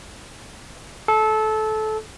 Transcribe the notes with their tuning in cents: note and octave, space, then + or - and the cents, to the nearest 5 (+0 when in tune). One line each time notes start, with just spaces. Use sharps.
A4 -20